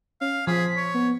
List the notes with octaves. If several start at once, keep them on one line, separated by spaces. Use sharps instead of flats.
C#4 F5
F3 G#4 B6
C#5
B3